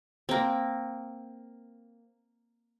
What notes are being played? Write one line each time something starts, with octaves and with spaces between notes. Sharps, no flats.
A#3 C4